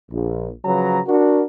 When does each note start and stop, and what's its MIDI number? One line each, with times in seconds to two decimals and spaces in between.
0.11 0.48 34
0.65 1.00 49
0.65 1.00 53
0.65 1.00 54
0.65 1.00 71
0.65 1.00 82
1.07 1.42 62
1.07 1.42 66
1.07 1.42 70